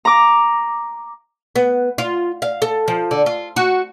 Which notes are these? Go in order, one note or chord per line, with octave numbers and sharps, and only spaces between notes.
A#5 D6
B3
F4
F5
A4
F3
D3
F4
F#4